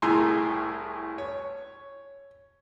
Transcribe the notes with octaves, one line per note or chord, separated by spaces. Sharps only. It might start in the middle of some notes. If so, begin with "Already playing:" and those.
C2 A2 G#4 G#5 A#5 C6
C#5